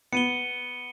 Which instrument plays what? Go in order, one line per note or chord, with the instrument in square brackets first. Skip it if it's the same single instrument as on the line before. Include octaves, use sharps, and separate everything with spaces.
[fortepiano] B3 [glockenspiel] C#7 D#7 G7